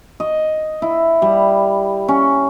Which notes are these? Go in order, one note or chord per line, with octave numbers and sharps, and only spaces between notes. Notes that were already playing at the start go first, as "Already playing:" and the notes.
D#5
E4
G3
C#4